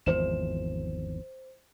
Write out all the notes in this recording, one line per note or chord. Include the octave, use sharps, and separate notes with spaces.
G#1 E2 F3 C5 E7